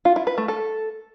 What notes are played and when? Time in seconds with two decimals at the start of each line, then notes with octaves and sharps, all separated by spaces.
0.05 F4
0.16 E4
0.27 B4
0.38 A3
0.48 A4